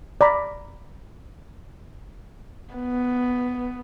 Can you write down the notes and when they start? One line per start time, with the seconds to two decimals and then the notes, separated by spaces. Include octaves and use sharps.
0.21 D5 A#5 B5
2.74 B3